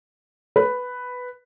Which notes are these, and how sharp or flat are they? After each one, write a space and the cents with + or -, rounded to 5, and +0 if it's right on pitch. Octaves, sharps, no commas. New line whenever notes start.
B4 +5